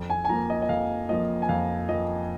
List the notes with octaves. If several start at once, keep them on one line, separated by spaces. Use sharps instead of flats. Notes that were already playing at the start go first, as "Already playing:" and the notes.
Already playing: F2
G#5
G#5
F3 A#3 A#5
D#5
D#5
F2 F5
F3 A#3 D#5
G#5
F2 F5
F3 A#3 D#5